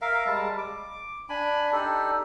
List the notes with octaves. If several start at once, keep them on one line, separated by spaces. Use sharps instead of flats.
A#4 E5 F5
G3 G#3 A5
D6
D4 G#5 B5
D4 D#4 G4 A4